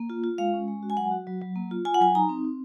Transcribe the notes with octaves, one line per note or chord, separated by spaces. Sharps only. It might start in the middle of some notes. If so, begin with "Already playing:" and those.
Already playing: A#3
F4
F4
G#3 F5
C#4
G#3
F#4
G#5
F#3 F#5
F#4
F#3
F#3
A#3
F4
F4 G#5
F#5
F#3 G#5
D#4 A#5
C4
C4